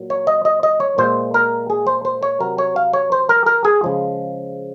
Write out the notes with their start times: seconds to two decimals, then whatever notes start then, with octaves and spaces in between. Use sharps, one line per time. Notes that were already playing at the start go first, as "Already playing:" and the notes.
Already playing: A#2 F#3
0.10 C#5
0.27 D#5
0.45 D#5
0.63 D#5
0.80 C#5
0.98 A#2 G#3 C5
1.34 A#4
1.70 G#4
1.87 C5
2.05 C5
2.23 C#5
2.40 C3 F#3 A#4
2.58 C#5
2.76 F5
2.93 C#5
3.12 C5
3.29 A#4
3.46 A#4
3.65 G#4
3.83 C#3 F3 G#3